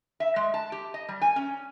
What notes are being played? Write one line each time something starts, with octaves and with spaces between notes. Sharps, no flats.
E5
G#3
A5
G4
D#5
G3
G#5
C#4